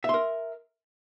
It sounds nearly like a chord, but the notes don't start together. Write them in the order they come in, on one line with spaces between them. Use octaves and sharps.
E5 C6 A#4